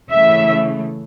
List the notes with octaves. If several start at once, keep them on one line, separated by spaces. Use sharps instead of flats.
C#3 E3 A3 E5